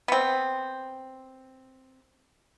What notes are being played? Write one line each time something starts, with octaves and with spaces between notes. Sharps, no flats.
B3 C4